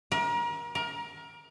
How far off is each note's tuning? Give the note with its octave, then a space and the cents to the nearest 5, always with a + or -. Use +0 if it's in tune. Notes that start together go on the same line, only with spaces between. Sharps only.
A#4 +35
A#4 +25